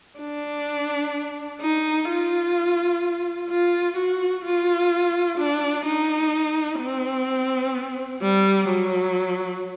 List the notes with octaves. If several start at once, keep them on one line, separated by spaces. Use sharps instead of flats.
D4
D#4
F4
F4
F#4
F4
D4
D#4
C4
G3
F#3